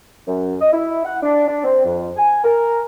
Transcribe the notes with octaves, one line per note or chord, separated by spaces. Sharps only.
F#2
D#5
E4
F#5
D4
D4
C4
F2
G#5
A#4